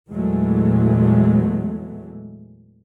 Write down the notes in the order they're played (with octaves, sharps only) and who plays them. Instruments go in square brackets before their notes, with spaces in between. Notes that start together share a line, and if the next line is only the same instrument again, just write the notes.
[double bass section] E2 A#2 E3 F#3 G#3 A3